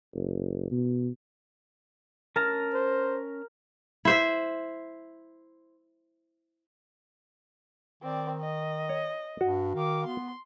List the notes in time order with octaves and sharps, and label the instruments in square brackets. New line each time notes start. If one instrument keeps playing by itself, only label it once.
[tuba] F#1
B2
[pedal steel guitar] C#4 A5 A#5 [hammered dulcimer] A#4
[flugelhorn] C5
[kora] E4 C5 E5
[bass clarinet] D#3 [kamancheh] C4 D5
[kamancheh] D#5
[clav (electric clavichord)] C#5
[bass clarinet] G2 [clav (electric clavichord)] F#4
[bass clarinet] D#3 [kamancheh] F5 D6
[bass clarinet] B3 [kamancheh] C6